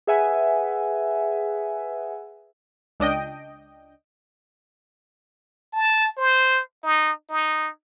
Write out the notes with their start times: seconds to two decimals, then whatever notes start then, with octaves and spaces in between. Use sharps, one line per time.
0.07 G#4 B4 E5 F#5 G#5
3.00 C#2 D4 D#5 G5
5.73 A5
6.17 C5
6.83 D#4
7.30 D#4